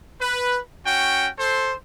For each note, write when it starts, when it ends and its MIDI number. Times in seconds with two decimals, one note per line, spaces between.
0.21 0.60 71
0.86 1.29 61
0.86 1.29 66
0.86 1.29 79
1.39 1.74 69
1.39 1.74 72